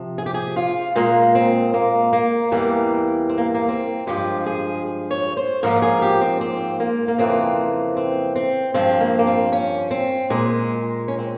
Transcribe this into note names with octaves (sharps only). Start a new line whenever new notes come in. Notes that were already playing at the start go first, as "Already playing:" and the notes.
Already playing: C3 F3
G#4
G4
G#4
F4
A#2 G#3 A#3
C4
A#3
A#3
E2 E3 G3 A#3
C4
A#3
A#3
C4
G2 F3 G#3 G4
G#4
C#5
C5
G#2 F3 A#3 A#4
G#4
G4
C4
C4
A#3
A#3
F2 C#3 E3 A#3 C4
C4
C4
G2 F3 G#3 C4
A#3
A#3
C4
C#4
C4
A#2 G#3
C#4
C4